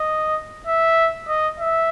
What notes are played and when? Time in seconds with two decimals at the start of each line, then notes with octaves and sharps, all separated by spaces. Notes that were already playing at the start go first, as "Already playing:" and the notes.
Already playing: D#5
0.67 E5
1.28 D#5
1.60 E5